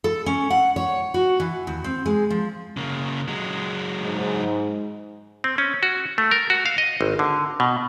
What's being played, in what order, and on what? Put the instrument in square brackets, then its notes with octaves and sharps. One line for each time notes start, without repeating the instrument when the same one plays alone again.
[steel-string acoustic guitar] A4
C#4
F#5
C#5
F#4
E3
D#2
C4
G#3
F3
[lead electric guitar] C#3 A#3
F#3 G#3
[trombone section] G#2
[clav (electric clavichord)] C4
C#4
F#4
A3
A#4
F#4
F5
D#5
G#1
D3
B2